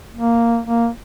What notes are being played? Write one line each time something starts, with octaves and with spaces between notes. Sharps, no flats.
A#3
A#3